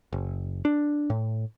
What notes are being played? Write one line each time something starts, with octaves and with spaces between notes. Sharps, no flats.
F#1
D4
A2